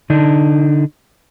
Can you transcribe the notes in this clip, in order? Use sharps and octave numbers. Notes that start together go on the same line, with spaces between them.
D3 D4 D#4